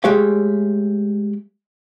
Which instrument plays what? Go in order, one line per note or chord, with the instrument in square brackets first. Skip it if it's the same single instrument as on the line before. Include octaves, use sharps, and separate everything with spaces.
[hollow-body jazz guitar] G#3 A3 G4 C#5 F5